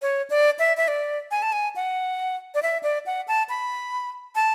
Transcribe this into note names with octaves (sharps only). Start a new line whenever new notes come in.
C#5
D5
E5
E5
D5
G#5
A5
G#5
F#5
D5
E5
D5
F#5
A5
B5
A5